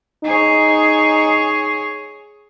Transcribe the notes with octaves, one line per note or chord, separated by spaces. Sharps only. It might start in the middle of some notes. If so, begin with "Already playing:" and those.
D#4 G#4 C#5